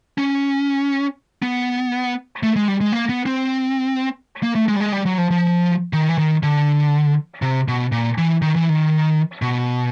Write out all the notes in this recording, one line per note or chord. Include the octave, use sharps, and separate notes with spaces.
C#4
B3
A3
G#3
G3
G#3
A#3
B3
C4
A#3
A3
G#3
G3
G#3
G3
F#3
F3
F3
D#3
E3
D#3
D3
C3
B2
A#2
E3
D#3
E3
D#3
B2